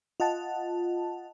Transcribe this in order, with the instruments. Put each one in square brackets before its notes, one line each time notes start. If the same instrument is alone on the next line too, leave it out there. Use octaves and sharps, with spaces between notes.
[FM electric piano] F4 D#5 F#5 A5